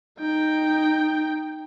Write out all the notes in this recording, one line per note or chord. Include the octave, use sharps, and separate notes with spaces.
D#4 G5